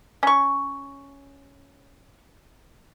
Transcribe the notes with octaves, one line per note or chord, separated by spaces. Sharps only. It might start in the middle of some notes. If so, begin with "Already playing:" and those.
C#4 C#6